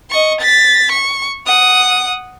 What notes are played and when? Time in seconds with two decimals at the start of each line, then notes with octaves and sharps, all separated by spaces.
0.10 D#5 C#6
0.41 A6 B6
0.92 C#6
1.46 F#5 D#6